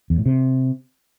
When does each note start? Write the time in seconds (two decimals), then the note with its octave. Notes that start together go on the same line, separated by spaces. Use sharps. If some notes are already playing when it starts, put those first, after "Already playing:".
0.10 E2
0.18 A2
0.26 C3